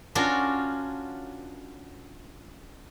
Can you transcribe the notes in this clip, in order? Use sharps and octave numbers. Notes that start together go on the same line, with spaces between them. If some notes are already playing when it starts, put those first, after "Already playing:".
C#4 D4 F4 F#4 A#4